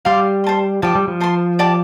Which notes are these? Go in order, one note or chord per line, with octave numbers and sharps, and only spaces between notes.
G3 D5 F5 C6
C5 A5 C6
F3 G4 D5 A5
G3
F3
C5 A5 C6
G4 D5 A5 D6